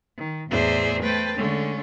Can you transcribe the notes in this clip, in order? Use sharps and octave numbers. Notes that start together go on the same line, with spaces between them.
D#3
E2 A2 G#4 C5 D5 E5
A3 B4 C5 G5 A5
D3 G#3 A3 C#4